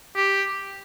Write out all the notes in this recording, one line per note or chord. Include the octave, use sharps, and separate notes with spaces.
G4